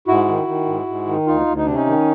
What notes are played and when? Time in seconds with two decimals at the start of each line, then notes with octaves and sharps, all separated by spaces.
0.08 G#2 E4 F#4
0.28 D#3
0.47 D#3
0.67 G#2
0.87 G#2
1.06 D#3
1.27 D2 D#4 F4
1.47 D2
1.57 D#4
1.66 C3 D4
1.74 C#4 D#4
1.86 D#3